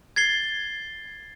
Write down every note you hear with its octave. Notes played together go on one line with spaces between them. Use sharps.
G#6 A6 C7 G7